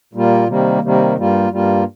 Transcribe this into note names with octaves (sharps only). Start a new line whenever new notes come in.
A#2 G3 A#3 F4
C3 D#3 G3 A#3
C3 D#3 G3 A#3
G2 G3 A#3 F4
G2 G3 A#3 F4